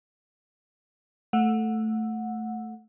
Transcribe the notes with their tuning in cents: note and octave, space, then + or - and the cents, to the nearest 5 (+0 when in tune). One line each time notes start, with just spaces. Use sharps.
A3 +0 F#5 -20